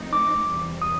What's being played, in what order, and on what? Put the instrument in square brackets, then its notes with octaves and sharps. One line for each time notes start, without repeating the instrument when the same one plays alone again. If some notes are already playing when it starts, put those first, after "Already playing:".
Already playing: [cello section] F3 A3 C4 D#4
[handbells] D6
[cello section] E2 C3 E3 G3
[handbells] D#6